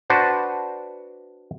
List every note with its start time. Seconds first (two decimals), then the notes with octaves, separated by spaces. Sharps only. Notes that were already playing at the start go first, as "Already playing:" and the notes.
0.10 D4 F#4 B4 C5